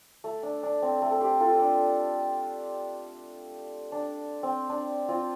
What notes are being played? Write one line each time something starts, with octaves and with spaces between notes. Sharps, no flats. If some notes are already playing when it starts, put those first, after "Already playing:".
A3
D4
D4
C4
A3
A4
G4 C5
F4 A4
D4
D4
C4
D4
C4 F4